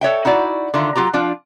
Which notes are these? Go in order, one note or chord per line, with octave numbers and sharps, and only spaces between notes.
A4 C#5 E5 G5
D#4 E4 F#4 D5
D3 D#3 F4 E5
F#3 D#4 F4 G4 A#5
F3 D4 F4